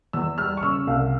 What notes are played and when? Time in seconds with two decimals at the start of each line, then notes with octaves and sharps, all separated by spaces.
0.13 E2 E6
0.38 G3 F6
0.57 C#6
0.63 C#3 E6
0.87 C2 F5